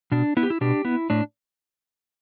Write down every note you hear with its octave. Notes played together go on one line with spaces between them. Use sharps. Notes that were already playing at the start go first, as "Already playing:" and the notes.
B2 D4
B3 E4
G4
E4
B2 D4 G4
B3 E4
A2 D4